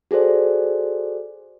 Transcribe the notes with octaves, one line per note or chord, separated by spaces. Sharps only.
F#4 G#4 A4 C5 D5